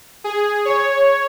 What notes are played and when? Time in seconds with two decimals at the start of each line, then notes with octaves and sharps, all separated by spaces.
0.24 G#4
0.65 C#5